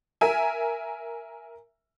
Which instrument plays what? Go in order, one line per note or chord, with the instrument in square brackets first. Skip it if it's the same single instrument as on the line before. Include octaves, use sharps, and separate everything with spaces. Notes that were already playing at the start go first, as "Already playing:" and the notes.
[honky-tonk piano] A#4 E5 G#5